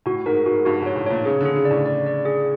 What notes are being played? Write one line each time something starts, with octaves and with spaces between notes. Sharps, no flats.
A2 F#4
G#2 A#4
G#2 F#4
G2 F#4
G#2 C#5
A2
A#2 C#5
C#3 G#4
D3 G#4
C#3
D5
A2
D5
D5
G#4